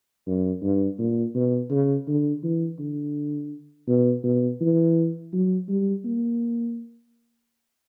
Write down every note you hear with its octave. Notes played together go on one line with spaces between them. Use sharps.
F#2
G2
A#2
B2
C#3
D3
E3
D3
B2
B2
E3
F#3
G3
A#3